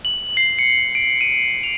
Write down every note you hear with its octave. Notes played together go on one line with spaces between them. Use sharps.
F#7
C7
C#7
D7
D#7
F7